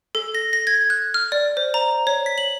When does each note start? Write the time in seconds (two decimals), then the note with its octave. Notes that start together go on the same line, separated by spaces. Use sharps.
0.15 A4
0.35 A#6
0.53 A#6
0.67 G#6
0.90 F#6
1.14 F6
1.32 D5
1.57 C5
1.74 A#5
2.07 C#5
2.26 B6
2.38 F#7